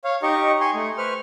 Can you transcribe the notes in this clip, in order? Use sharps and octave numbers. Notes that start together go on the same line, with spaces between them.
C#5 F5
D#4 G4 D#5 C#6
G#5 C6 C#6
A3
B4 C5 C#6 F6